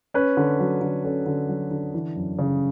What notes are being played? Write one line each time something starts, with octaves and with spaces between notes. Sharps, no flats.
C#4 B4
D3
F#3
D3
C#4 A4
D3
F#3
D3
E3
F#2
C#3